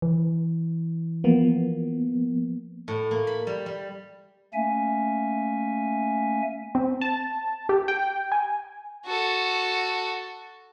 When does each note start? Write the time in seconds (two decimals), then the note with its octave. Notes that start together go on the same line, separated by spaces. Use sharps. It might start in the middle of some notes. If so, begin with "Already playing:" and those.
0.02 E3
1.24 F3 A#3 B3
2.88 A2
3.11 A#3
3.27 B5
3.47 G3
3.66 G3
4.54 A3 A#3 C#4 E5 G#5
6.75 C4
7.01 A5
7.69 G4
7.88 G5
8.32 G#5
9.06 F#4 A4